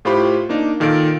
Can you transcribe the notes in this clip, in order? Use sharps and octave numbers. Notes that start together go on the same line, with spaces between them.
A2 F4 G4 C5 B5 C#6
A#3 D4 D#4
A#2 D#3 A4 F5 A6 D7